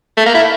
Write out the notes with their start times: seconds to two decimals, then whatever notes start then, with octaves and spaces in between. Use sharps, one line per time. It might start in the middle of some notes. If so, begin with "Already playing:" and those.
0.17 A3
0.26 A#3
0.35 E4